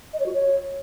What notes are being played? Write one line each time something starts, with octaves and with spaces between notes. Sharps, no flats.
D#5
C#5
F#4
C#5